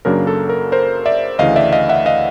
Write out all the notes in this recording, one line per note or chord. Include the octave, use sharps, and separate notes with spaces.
F#2 C#3 F#3 A#3 D4 A#4
A4
A#4
A#4 C5
D5 E5
D2 C#3 E3 D#5 F5
D5 E5
D#5 F5
E5 F#5
D#5 F5